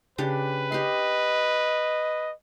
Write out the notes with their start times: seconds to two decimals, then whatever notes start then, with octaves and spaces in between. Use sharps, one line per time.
0.18 C#3 D4 G4 B4
0.72 G4 D#5 C6